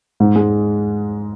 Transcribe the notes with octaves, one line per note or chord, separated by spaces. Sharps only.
G#2
G#3